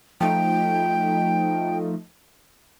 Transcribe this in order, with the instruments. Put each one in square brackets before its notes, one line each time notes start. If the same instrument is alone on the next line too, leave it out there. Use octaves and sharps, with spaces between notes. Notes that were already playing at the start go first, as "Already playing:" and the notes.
[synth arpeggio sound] F3 A3 D#4 [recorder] G5